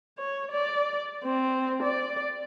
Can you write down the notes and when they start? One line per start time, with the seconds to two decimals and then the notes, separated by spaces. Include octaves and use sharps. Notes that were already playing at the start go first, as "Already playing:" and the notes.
0.18 C#5
0.52 D5
1.24 C4
1.83 D5